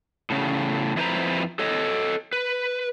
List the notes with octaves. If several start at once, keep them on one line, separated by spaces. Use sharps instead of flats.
A2 C#3
F2 E4 B4 C5 A#5
A4 C#5 D#5
B4